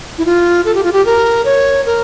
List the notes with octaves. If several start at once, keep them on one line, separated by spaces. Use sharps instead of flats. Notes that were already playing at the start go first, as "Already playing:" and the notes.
E4
F4
A4
G4
F4
G4
A#4
C#5
A#4